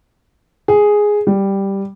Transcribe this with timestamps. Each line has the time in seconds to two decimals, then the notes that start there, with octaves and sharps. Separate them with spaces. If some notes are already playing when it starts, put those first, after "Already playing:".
0.68 G#4
1.27 G3